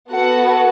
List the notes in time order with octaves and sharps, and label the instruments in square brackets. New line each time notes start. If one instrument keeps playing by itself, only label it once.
[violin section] B3 F#4 A4 F#5